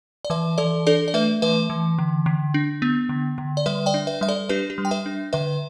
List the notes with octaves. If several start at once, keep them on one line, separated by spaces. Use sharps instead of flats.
D5
E3 B4 E5
E3 A4 D5
D4 A4 D5
D5
A3 B4 E5
E3 B4 E5
E3
D3
D3
D4
B3
D3
D3
D5
G3 B4 E5
D5 G5
D4
B4 E5
G3 E5
A4 D5
D4 G4 B4
G4
G3
G5
B4 E5
D4
D3 B4 E5